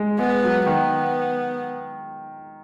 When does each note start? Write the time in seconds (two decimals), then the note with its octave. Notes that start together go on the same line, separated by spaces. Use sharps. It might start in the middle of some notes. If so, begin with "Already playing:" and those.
Already playing: G#3
0.19 G#3 B3
0.44 F#3
0.66 D#3 B3